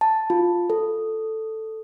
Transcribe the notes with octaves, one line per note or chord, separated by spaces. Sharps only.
A5
F4
A4